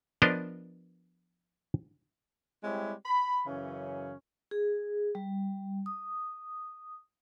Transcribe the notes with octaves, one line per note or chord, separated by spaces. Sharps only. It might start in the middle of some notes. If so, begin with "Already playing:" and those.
F3 B3 D4 A#4 C5 D#5
G3 G#3 C4 E4 G4 C#5
B5
F#2 C#3 E3 C#4
G#4
G3
D#6